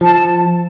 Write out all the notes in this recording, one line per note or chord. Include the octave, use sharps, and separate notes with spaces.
F3 A5